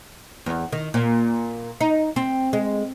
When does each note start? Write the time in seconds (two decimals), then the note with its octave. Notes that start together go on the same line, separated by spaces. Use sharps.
0.46 E2
0.72 D#3
0.94 A#2
1.81 D#4
2.16 C4
2.53 G#3